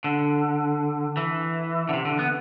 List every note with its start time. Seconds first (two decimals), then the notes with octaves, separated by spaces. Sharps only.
0.04 D3
1.17 E3
1.89 D3
1.93 C3
2.05 D3
2.19 B3